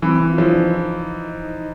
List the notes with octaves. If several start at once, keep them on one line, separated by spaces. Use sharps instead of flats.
E3 C4
E4
F4
F3 E4
D4
D#4